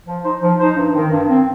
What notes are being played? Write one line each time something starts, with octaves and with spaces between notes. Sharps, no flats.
F3
D#4 C5
F3
D#4 C5
G2
D#3 C4
G2
D#3 C4